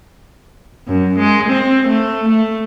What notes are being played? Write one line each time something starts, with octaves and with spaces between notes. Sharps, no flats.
F#2
G#3
C4
A3
A3